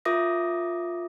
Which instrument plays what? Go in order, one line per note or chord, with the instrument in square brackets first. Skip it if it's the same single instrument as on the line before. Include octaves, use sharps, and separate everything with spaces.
[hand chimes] F4 A#4 E5 D6 D#6 A#6